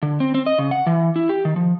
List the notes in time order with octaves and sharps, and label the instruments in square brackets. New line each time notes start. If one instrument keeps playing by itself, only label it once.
[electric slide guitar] D3
C4
C4
D#5
C#3
F#5
E3
E4
G4
D#3
F3